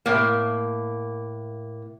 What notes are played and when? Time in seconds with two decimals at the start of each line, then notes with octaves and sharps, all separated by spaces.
0.06 A2 A#3